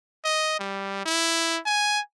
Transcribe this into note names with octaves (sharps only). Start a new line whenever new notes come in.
D#5
G3
E4
G#5